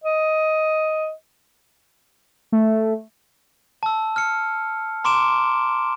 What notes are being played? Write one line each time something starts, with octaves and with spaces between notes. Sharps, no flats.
D#5
A3
A5 E6
F6 C#7
A#5 C6 D6 D7 E7